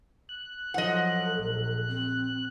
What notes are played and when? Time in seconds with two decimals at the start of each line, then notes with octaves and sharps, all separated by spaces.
0.29 F#6
0.74 F3 F#3 A4 D#5 F#5
1.33 A#1
1.89 C4